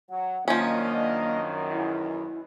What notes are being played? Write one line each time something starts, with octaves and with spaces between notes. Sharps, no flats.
F#3 F#5
F#2 D#3 F3 A#3 C#4 D4 D#5 F5
B1 E2 E4